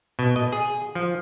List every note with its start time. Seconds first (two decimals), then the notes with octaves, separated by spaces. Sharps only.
0.19 B2
0.36 D#5
0.52 G#4
0.95 F3